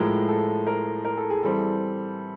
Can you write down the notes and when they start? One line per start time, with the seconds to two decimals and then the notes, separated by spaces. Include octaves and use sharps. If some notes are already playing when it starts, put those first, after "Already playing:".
Already playing: A2 F3 G#3 A#4
0.29 A4
0.67 A#4
1.05 A#4
1.17 A4
1.30 G#4
1.43 E3 G3 C4 A4